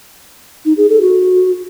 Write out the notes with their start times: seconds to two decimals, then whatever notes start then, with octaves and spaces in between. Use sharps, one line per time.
0.65 D#4
0.77 G#4
0.89 A4
1.01 F#4